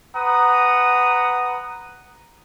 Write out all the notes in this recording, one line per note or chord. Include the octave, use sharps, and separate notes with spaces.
B4 F#5 A#5 D#6